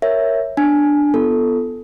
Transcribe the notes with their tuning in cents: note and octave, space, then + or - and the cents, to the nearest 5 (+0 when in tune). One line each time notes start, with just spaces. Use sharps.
A#4 +0 C#5 -10 E5 +0
D4 +0 G#5 +5
B3 +0 F4 -35 A4 +0